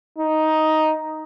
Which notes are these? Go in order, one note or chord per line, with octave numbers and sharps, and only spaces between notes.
D#4